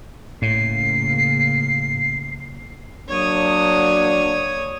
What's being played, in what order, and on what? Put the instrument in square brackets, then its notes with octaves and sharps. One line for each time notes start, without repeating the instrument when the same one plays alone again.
[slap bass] A2 [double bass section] C#3 A#3 [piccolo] C7
[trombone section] F#3 A#3 D4 [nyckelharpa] C#5 D#6